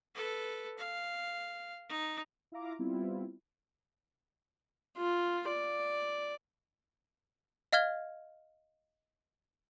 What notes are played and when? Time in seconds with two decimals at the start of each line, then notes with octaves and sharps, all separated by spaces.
0.15 A4 B4
0.78 F5
1.89 D#4
2.52 E4 F4 E5 F5 A#5 D6
2.79 G3 B3 C4 E4 F4
4.98 F4
5.49 D5
7.73 D#5 F5 F6 G#6 G7